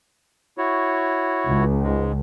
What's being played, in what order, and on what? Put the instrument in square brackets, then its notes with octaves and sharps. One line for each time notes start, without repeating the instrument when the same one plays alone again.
[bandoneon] E4 F#4 C#5
[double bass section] C#2
[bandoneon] G#2 G#3